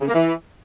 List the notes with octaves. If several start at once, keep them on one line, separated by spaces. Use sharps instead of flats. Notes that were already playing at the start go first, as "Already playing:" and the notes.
C#3
A#3
E3